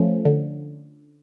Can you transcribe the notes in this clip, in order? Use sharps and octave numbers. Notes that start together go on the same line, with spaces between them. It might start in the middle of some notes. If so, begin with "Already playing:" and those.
Already playing: F3 A3 C#4
D3